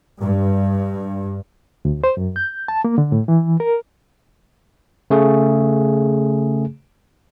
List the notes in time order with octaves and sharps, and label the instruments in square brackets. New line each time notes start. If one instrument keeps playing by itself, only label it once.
[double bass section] G2
[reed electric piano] D2
C5
F#2
G6
A5
A#3
D3
A2
E3
A#4
[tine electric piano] C#3 A3 G#4